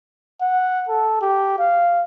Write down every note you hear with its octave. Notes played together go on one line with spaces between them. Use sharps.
F#5
A4
G4
F5